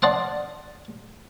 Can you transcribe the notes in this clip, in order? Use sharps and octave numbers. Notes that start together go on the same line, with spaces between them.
D5 D#5 F#5 A5 C6